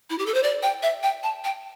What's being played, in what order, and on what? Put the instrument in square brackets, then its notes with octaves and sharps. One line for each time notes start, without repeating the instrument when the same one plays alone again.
[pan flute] E4
G4
A4
C5
D5
G5
E5
G5
A5
G5